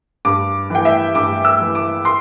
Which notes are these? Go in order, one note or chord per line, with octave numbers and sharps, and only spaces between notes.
G2 D6
E3 G5
E5
G2 D6
E6
E3
D6
C6